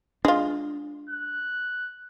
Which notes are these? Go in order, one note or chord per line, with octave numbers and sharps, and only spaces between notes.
G#3 D4 F4
F#6